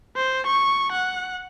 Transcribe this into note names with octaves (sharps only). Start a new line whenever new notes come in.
C5
C#6
F#5